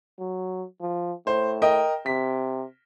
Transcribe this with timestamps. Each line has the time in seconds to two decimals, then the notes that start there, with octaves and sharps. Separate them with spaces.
0.19 F#3
0.81 F3
1.27 A2 C5
1.62 A#4 D#5 G5
2.06 C3 B6